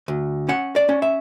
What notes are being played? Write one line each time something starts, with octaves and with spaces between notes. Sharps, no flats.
D2
C#4 F#5
D5
C#4
E5